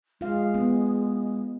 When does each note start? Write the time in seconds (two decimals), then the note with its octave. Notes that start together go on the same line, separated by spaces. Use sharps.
0.21 G#3 F4 F5
0.54 B3